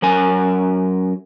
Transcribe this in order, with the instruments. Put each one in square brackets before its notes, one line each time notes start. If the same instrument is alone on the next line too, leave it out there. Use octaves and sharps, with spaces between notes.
[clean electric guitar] F#2 A#4 G#5